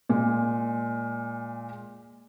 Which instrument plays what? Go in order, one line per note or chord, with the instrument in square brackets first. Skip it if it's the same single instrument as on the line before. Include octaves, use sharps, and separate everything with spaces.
[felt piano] A#2 G#3